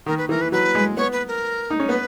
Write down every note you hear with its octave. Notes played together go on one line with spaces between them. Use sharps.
D#3 A#4
B4
E3 A#4
B4
F#3 B4
G#3
B3 C#5
B4
A#4
D#4
C#4
B3 B4